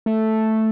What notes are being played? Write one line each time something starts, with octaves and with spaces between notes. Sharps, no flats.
A3